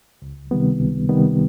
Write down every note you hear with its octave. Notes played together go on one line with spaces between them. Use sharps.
C#2
C3 D#3 G3 B3
C#2
C3 D#3 G3 B3